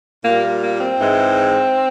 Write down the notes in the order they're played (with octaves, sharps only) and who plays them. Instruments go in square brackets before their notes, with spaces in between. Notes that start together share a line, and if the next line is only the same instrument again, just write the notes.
[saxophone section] A#2 G3 A#3
A#3
C4
G#2 E3 G#3